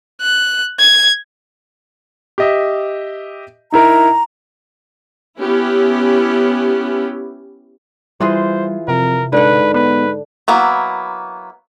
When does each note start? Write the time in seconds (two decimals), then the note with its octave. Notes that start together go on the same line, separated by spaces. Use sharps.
0.21 F#6
0.79 G#6
2.38 G4 D#5 E5
3.72 D#4 E4 A#4 A#5
5.37 B3 C#4 E4 G4
8.20 E3 G3 F4 G#4 C5
8.88 F2 C3 A#4
9.33 G#2 D3 B4 F#5
9.74 B3 B4
10.48 F#3 A#3 B3 E4